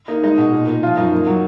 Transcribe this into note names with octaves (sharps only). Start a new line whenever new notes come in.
A#3 D#4
G#3 D#4
B2
A#2
A#2
F3 F4
F#2 D#4
A#3
F#3